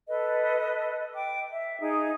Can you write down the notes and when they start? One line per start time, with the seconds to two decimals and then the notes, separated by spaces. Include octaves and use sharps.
0.08 A4 B4 D#5
1.14 G5 D6
1.52 E5
1.81 D#4 G#4